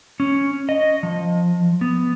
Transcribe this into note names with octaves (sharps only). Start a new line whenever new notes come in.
C#4
D#5
F3
B3